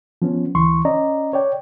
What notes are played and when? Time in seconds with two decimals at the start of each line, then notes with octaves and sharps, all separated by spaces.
0.22 F3 B3 C#4
0.55 D2 E3 C6 C#6
0.85 C#4 D5 D#5 A#5
1.33 C#5 D5 G5